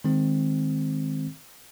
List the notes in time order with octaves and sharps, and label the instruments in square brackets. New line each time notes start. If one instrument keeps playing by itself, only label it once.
[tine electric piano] D#3 G#3 C4